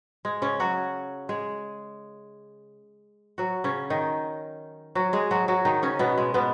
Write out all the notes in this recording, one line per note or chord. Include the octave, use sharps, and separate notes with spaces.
G#3
C#3 C#4
F#3 F#4
G#3 G#4
F#3 F#4
C#3 C#4
D#3 D#4
F#3 F#4
G#3 G#4
F#3 F#4
F#3 F#4
D#3 D#4
C#3 C#4
B2 B3
G#3
B2 B3